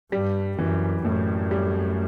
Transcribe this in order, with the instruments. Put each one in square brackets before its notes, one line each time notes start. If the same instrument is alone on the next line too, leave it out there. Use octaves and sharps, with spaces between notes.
[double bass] G2 [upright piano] G3
[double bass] F#2 [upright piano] E3
[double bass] F#2 [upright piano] A2
[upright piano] G3